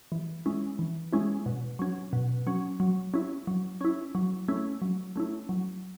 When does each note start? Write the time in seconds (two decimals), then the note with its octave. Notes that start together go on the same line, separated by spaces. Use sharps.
0.12 E3
0.46 G#3 C#4 E4
0.79 E3
1.13 G#3 C#4 E4
1.46 B2
1.79 F#3 C#4
2.13 B2
2.47 F#3 C#4
2.80 F#3
3.14 C#4 E4
3.47 F#3
3.81 C#4 E4
4.15 F#3
4.48 A3 C#4 E4
4.82 F#3
5.16 A3 C#4 E4
5.49 F#3